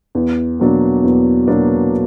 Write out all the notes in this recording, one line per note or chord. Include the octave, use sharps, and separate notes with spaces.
E2
B2 F#3 A#3 D4
E2
B2 F#3 A#3 D4